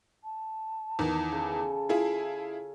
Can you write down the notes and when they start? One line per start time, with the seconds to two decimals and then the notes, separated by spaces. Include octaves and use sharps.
0.24 A5
0.99 E2 D#3 E3
1.32 C#3 A4
1.89 E4 F4 G#4